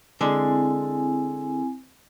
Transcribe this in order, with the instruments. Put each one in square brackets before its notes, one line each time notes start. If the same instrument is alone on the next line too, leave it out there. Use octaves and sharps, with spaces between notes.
[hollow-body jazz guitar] D3 G#3 [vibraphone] C4 E4 G#5